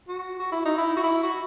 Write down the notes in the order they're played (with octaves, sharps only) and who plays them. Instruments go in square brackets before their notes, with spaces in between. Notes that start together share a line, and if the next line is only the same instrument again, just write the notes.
[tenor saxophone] F#4
F#4
E4
D#4
E4
F#4
E4
F#4